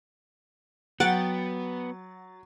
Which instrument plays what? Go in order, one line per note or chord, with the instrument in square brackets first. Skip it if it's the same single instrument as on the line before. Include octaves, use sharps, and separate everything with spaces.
[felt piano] F#3 [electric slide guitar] B3 [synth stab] F#5 A6 [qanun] G5